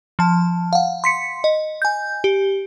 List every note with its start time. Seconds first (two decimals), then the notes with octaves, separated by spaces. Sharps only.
0.19 F3 A5
0.73 F5 F#5
1.04 C6 B6 C#7
1.44 D#5
1.82 G#5 G6
2.24 G4